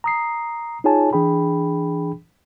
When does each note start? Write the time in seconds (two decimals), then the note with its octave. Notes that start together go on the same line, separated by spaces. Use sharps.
0.04 A#5 D#6 C7
0.84 D#4 F4 G#4 C#5 G#5 A5
1.13 E3 D4 G#4 G5 B5